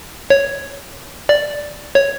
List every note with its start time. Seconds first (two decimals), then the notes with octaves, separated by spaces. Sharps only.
0.30 C#5
1.29 D5
1.95 C#5